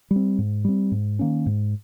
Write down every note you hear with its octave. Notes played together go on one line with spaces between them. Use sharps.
G3
C4
G#2
G3 C4
G#2
D#3 A#3 C#4
G#2